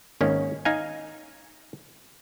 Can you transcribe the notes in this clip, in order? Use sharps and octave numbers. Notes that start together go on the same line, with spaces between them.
G#1 D#3 A#3 C#4
D#4 F5 G#5